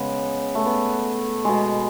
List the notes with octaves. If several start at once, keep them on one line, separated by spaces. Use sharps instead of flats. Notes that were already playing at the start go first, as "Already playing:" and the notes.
Already playing: C#3 G#3 B3
A3
B3
B2 G#3